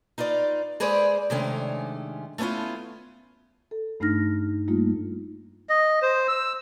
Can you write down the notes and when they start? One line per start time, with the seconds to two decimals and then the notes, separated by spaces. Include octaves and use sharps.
0.18 D#4 F4 B4 D5
0.80 G#3 G#4 B4 C5 D5
1.30 C3 D#3 G#3 A3 C#4 D4
2.38 A3 B3 C#4 E4 F4
3.71 A4
4.00 G2 A3 D4 D#4 F6 A#6
4.68 G3 A3 A#3 D#4 F4
5.69 D#5
6.02 C5
6.28 E6